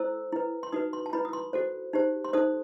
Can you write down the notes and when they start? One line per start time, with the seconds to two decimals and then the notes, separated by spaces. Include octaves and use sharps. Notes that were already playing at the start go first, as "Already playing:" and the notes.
Already playing: E4 A4 C5 E6
0.32 E4 B4
0.63 C6
0.72 D#4 F#4 B4 D#6
0.93 C6
1.06 A5
1.13 E4 B4 B5
1.25 D#6
1.33 C6
1.53 F#4 A4 C5
1.93 D#4 G4 C5
2.24 C6
2.33 D#4 A4 C5 D#6